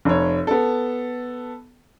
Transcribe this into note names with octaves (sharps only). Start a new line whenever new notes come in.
F1 C#5
B3 A4